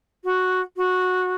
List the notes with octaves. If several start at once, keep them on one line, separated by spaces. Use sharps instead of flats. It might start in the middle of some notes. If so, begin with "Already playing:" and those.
F#4
F#4